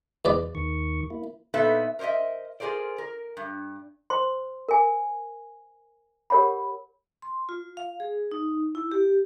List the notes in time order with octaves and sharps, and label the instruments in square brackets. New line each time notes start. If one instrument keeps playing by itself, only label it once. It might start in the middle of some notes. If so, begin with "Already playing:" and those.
[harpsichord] E2 B4 D5
[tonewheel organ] D#2 D#3 C#6
A#3 E4
[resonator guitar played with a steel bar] A#2 B3 D#4 A4 B4 E5
A#4 C5 C#5 D#5 E5
F4 G#4 A#4 C5 D5
A#4
G2
[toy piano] C5 C6
A#4 G#5
G4 A#4 C#5 F#5 B5
[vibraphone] C6
F4
F5
G#4
D#4
E4
G4